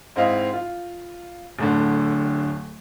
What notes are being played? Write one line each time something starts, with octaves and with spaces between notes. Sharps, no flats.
G#2 C4 E4 D#5 F5
F4
D1 A2 D3